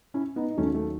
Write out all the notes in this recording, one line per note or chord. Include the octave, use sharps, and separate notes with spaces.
C#4 E4
B3 D#4
D#4
D#2 D#3 F#3 A3 C#4
A3